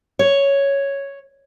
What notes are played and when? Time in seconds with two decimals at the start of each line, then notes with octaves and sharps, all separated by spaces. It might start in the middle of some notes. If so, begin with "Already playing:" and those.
0.19 C#5